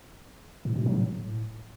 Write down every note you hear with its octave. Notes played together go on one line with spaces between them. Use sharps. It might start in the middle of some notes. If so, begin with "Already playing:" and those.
A2
B2
F#3
A2